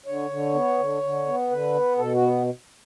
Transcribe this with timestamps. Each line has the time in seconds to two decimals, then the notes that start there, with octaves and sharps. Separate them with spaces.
0.06 D3 C#5
0.30 D3
0.54 B3
0.78 D3
1.03 D3
1.26 B3
1.50 D3 B4
1.74 B3
1.98 B2 A4
2.14 F#4
2.22 B3